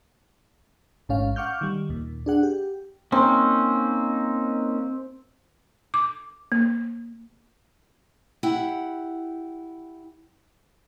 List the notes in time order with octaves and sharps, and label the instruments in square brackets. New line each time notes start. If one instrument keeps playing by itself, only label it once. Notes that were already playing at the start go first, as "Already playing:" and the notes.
[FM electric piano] A1 G#2 C#4 F5
F5 F#5 C#6 D6 F6 G6
D#3 G3
D#2 A#2
D4 G#4 F#5
G4
[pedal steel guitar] A#3 C#4 D#4 [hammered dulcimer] C4
[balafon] D6
A#3
[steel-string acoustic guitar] E4 G4 F#5